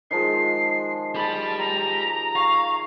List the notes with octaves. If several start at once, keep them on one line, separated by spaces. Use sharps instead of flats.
D#3 F3 G#3 C7
G4 A5 B5
A#5
F5 C#6